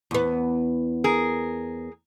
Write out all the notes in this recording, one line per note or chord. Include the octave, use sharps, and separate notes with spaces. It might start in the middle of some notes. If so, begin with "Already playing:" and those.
E2 B3
G#4 A#4